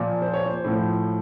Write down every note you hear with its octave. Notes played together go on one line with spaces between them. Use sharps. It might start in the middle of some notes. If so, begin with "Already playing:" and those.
Already playing: A#2 F3
C5
C#5
C5
A2 F3